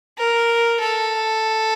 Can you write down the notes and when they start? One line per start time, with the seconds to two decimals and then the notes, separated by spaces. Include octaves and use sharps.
0.18 A#4
0.80 A4